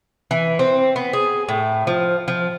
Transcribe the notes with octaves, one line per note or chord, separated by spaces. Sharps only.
E3
C4
B3
G#4
A2
F3
F3